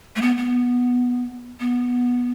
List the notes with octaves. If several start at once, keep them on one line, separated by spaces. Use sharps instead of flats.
A3
B3
B3
B3